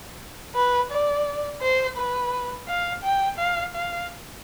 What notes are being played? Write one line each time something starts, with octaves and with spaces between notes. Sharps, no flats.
B4
D5
C5
B4
F5
G5
F5
F5